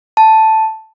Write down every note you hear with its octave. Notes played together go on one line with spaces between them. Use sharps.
A5